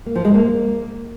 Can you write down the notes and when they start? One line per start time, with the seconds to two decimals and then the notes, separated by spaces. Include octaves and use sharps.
0.06 A#3
0.15 F3
0.25 G#3
0.34 A#3